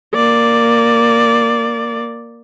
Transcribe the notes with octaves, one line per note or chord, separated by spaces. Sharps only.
A#3 D5